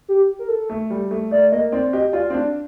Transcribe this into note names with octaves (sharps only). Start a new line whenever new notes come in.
G4
A#4
A4
A3
G3
A3
A3 D5
A#3 D#5
C4 D5
G4 D#5
F4 D5
C4
D4 D5